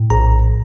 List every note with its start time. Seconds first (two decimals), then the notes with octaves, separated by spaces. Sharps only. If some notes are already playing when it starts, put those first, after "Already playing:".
Already playing: A2
0.10 A#1 A#5